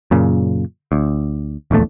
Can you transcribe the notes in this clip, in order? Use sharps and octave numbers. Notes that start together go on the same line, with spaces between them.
F#2 A#2 C#3
D2
D1 A#1 E2 A3